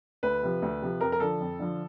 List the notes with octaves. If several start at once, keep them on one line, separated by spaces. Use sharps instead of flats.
D2 B4
C3 F3
D2
C3 F3
F2 A#4
A#4
D3 F3 A4
F2
D3 F3